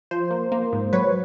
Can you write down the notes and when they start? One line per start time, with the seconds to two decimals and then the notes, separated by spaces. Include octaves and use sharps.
0.11 F3 C5
0.31 A#3
0.52 A#3
0.73 G#2
0.93 F#3 B4 C#5